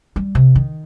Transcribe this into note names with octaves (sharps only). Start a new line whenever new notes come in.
G3
C3
D#3